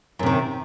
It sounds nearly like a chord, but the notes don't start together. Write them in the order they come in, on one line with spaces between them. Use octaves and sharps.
F#2 C3 D#3